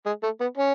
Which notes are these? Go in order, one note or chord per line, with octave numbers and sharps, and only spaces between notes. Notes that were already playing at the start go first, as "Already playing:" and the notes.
G#3
A3
B3
C#4